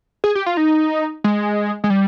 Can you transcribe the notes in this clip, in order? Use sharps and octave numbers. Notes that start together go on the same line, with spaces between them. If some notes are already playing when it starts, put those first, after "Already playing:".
G#4
G4
F4
D#4
G#3
G#3
G3